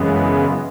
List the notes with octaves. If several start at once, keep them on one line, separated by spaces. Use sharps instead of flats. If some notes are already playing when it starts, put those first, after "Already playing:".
Already playing: F#2 C#3 E3 G#3 B3